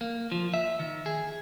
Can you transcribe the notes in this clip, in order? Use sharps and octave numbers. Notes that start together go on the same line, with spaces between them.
A#3
F3
E5
D#3
G#4